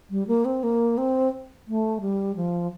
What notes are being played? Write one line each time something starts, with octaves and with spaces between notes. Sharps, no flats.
G3
A#3
C4
A#3
C4
A3
G3
F3